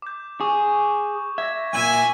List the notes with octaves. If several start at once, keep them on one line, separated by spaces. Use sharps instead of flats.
D6 G6
G#4 C#6 D6
E5 G#6 A#6
B1 A#2 E5 G#5 D#7 F#7